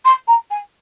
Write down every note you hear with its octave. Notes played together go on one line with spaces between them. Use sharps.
C6
A#5
G#5